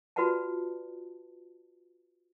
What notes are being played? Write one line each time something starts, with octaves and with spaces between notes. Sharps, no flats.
F4 F#4 B4 D5 F#5 A5